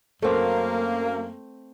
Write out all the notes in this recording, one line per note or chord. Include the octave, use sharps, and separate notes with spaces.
F#2 A3 A#3 C4